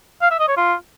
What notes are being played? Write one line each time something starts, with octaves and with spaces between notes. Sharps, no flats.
F5
E5
D#5
C#5
F4